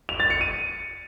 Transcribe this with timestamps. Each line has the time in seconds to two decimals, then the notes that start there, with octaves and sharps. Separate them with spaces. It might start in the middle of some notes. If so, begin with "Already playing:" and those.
0.09 F7
0.20 A6
0.30 C#7
0.41 D#7